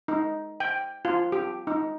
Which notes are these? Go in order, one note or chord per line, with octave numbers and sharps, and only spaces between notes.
D#4
G5
F4
G4
D#4